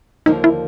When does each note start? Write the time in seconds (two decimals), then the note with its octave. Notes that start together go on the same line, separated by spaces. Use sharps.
0.26 D#2 D3 F3 A#3 D#4
0.44 E4